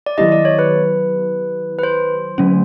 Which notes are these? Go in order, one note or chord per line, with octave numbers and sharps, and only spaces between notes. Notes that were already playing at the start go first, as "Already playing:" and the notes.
D5
D#3 F#3 B3 E4 G4 D#5
D5
C#5
B4
B4
C5
D3 F#3 A3 C#4